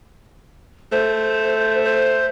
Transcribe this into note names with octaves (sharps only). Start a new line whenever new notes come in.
A3 C5
C5